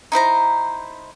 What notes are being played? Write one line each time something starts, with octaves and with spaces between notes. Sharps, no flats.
D#4 E4 C5 A#5